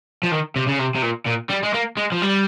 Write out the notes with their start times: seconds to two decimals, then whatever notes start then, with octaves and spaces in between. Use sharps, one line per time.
0.23 F3
0.32 D#3
0.56 C3
0.67 C#3
0.79 C3
0.95 C3
1.02 A#2
1.26 A#2
1.50 G3
1.64 G#3
1.74 A#3
1.97 G#3
2.12 F3
2.22 G3